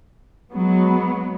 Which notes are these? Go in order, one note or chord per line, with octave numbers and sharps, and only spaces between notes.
F#3 G#3 B3